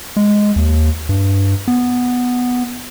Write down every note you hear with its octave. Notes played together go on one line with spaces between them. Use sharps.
G#3
D#2
G2
B3